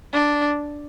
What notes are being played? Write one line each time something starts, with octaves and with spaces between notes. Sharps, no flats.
D4